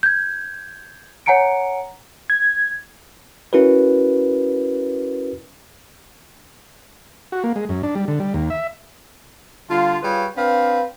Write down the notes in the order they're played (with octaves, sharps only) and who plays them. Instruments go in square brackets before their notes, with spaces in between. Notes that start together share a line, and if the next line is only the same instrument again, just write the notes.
[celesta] G6 G#6
C#5 F#5 G#5 A#5 C#7 D7
[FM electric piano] G#6
[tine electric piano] C#4 E4 F#4 A#4 B4
[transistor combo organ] F#4
A#3
G#3
F#2
D4
G3
D3
G3
D#2
E5
[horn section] D3 G3 F4
G3 F4 G#4 B4 C#5
C4 D4 B4 F5